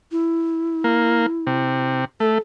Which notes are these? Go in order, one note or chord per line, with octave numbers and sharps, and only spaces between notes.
E4
A#3
C3
A3 A4